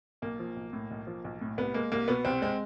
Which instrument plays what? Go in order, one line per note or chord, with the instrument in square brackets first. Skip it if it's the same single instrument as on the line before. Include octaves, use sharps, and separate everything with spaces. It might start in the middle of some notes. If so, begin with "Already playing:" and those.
[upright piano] B1 A#3
F3
B1
A2
B1
F3
B1
A2
C2 B3
G#3 A#3
C2 A#3
B2 B3
C2 C4
G#3 C4